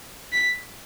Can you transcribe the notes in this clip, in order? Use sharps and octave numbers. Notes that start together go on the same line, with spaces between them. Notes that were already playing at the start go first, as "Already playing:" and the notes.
B6